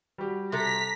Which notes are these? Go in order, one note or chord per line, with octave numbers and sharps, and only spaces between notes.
G3 F#4 G4
C3 A4 A#5 B6